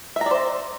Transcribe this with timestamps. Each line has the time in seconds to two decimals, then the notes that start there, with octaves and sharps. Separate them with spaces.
0.16 E5
0.21 A#5
0.26 D5
0.31 C5